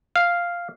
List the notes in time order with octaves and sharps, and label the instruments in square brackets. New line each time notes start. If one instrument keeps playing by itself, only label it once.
[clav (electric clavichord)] F5